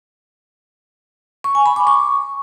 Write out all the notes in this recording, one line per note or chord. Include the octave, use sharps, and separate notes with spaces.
C#6
G#5
B5
D6
C#6